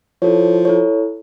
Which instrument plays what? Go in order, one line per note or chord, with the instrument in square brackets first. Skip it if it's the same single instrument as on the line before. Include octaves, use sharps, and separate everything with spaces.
[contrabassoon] F3 [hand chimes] E4 A4 C#5
[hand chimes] E4 A4 C#5